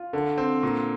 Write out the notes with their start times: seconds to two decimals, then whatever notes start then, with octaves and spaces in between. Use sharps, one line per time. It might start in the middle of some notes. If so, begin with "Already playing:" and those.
Already playing: F4
0.13 D3
0.38 C4
0.63 A#2